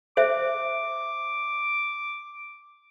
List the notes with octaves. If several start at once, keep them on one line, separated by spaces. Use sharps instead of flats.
C5 E5 D6